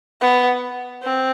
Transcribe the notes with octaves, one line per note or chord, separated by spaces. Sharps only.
B3
C4